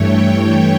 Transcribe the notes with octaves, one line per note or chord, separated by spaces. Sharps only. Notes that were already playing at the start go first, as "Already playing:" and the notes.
Already playing: G2 E3 A3 C#5 G5